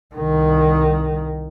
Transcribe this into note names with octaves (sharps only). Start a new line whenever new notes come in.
C2 D#3